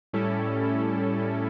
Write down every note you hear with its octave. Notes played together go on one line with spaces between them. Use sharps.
A2 G3 C#4 E4 A4